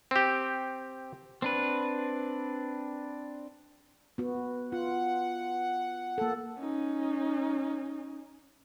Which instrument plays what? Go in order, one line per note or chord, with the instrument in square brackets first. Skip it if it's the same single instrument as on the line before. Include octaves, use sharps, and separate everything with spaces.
[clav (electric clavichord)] C4 G4
[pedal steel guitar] C4 D4 B4
[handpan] B3 F#4
[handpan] F4 [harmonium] F#5
[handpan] A#3 A4
[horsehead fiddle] C#4 D#4